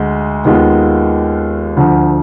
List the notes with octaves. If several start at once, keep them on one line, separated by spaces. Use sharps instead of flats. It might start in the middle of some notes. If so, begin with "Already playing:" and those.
Already playing: D2 G#3
D#2 D#3 G#3 B3 F4
D2 D3 F3